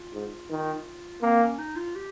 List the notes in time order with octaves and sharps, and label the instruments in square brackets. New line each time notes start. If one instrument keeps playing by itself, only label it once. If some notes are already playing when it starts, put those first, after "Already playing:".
Already playing: [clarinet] F4
[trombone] G#2
D#3
[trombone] A#3 [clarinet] C4
[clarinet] C#4
D#4
F4
G4